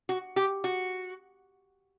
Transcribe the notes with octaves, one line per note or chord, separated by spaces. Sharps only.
F#4
G4
F#4